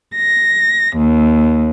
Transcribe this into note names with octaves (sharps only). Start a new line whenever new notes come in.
A#6
D#2